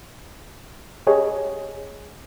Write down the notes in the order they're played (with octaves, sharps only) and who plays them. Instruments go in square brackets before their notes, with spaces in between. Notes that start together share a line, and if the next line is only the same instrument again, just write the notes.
[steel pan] G4 G#4 C#5 D#5